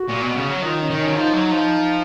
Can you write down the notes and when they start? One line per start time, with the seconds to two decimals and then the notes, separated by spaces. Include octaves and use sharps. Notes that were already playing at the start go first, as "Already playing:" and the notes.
Already playing: F#4
0.09 A#2
0.22 B2
0.36 C#3
0.49 F#3
0.62 D#3 F4
0.80 C#4
0.90 D#3
0.99 C#4
1.08 F#3
1.16 F3 D#4
1.33 F#3
1.52 F3